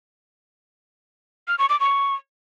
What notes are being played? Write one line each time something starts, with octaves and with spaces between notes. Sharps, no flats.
F6
C#6
D6
C#6